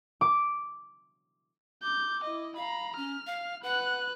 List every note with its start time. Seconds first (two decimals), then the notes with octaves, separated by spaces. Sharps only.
0.21 D6
1.83 D6 G6
2.24 E4 D#5
2.56 F5 A#5 B5
2.97 C#4 F6
3.27 F5
3.63 B4 F#5 F#6